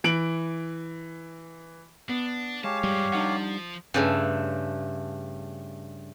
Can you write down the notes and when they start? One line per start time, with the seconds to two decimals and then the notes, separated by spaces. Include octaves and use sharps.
0.04 E3 D7 F#7
2.09 B3 D4
2.64 G#3 G4 C#5 F5 A5
2.84 G2 F3 G3
3.13 F3 D4 D#4 F#5
3.94 G2 C#3 A3